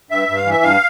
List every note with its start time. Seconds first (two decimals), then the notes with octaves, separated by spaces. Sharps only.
0.11 G2 E5
0.29 G2
0.37 F5
0.45 E3
0.51 E5
0.63 G2 F5